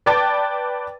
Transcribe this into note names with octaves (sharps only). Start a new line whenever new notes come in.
B4 D5 G5 A5 D6 A6